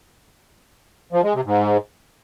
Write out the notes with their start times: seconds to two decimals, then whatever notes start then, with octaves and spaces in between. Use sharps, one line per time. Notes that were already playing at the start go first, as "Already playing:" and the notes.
1.13 F3
1.23 G#3
1.34 C3
1.45 G#2